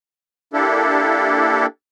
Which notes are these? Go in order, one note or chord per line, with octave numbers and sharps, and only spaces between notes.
A#3 D4 E4 G4 A4